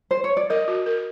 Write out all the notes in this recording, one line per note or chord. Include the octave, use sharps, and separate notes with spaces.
C5
C#5
D5
A#4 D#5
F#4
A#4